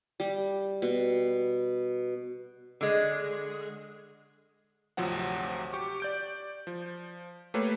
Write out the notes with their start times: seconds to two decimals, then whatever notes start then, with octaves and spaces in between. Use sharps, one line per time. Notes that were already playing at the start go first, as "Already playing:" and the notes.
0.20 G3
0.82 B2
2.81 D3 G#3
4.97 G#1 D2 C3 F3 F#3 F#5
5.73 G4 C#6 D6
6.00 D5 G6 D7
6.67 F3
7.54 A3 A#3 G4 B4 C#5